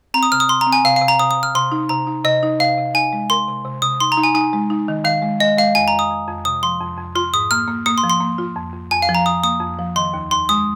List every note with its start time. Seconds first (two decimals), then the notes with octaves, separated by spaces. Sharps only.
0.14 C4 A#5
0.23 D#6
0.32 C3 F6
0.40 D#6
0.49 C3 C6
0.61 A#5
0.66 C4
0.73 G#5
0.85 C3 F5
0.96 F5
1.01 C3
1.08 A#5
1.19 C3 D#6
1.31 D#6
1.38 C3
1.43 F6
1.55 C3 C6
1.72 D#4
1.89 C3 A#5
2.07 D#4
2.24 C3 D#5
2.43 D#4
2.59 C3 F5
2.78 C3
2.94 D#4 G#5
3.13 G#3
3.30 A#4 C6
3.48 C3
3.65 C3
3.82 C3 D#6
4.00 D#4 C6
4.12 A#5
4.17 D#4
4.24 G#5
4.35 D#4 G#5
4.53 G#3
4.70 D#4
4.88 D#3
5.05 D#3 F5
5.22 G#3
5.40 G#3 D#5
5.57 G#3 F5
5.75 F2 G#5
5.88 A#5
5.93 F2
5.99 D#6
6.10 F2
6.27 F2
6.45 C3 D#6
6.63 F3 C6
6.81 F2
6.98 F2
7.15 F4 C6
7.34 G#2 D#6
7.51 A#3 F6
7.68 A#3
7.86 A#3 D#6
7.98 C6
8.04 F3
8.10 C6
8.20 A#3
8.38 F4
8.56 F2
8.74 F2
8.91 F2 G#5
9.02 F5
9.09 F3
9.15 A#5
9.26 F2 D#6
9.43 A#3 D#6
9.61 F2
9.79 F3
9.96 D#3 C6
10.14 D#2
10.31 D#2 C6
10.49 G#3 D#6